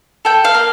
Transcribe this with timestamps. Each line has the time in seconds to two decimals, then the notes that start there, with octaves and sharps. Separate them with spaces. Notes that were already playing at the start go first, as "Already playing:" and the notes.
0.25 A4 G5
0.45 F5
0.55 A#3